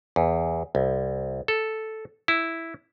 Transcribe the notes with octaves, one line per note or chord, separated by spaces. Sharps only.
E2
C2
A4
E4